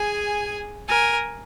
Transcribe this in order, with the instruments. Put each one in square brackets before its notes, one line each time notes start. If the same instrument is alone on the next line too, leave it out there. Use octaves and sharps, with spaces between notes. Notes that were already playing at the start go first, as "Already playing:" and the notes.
Already playing: [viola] G#4 [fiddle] G#5
[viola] A#4 [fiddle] G#5